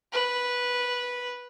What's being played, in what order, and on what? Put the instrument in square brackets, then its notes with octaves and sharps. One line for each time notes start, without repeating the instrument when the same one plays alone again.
[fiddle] B4